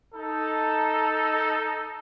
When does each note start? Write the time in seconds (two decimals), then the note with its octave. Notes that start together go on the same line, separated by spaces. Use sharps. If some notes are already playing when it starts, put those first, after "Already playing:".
0.14 D#4 A4